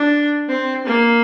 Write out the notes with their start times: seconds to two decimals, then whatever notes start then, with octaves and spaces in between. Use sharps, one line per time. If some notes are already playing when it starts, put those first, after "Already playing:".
Already playing: D4
0.48 C4
0.86 A#3